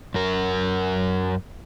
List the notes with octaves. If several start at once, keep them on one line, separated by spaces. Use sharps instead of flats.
F#2 A#4